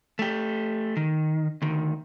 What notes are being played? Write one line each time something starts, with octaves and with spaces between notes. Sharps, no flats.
A3 G4
D#3
D2 D#3